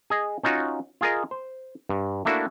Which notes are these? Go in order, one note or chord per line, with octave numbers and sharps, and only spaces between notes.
G#4 D#5
C#4 D#4 F4 F#4
F4 G#4 A#4 D#5
C5
G2
A3 A#3 D4 E4 F#4